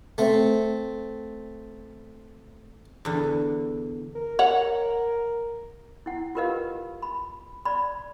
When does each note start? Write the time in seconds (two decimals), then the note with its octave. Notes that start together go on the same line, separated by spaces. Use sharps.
0.18 A3 C4
3.05 E2 D3
4.15 A#4
4.39 C#5 F#5
6.06 E4 F#5
6.35 F4 G4 A#4 B4 D#5 F5
7.02 B5
7.65 D5 B5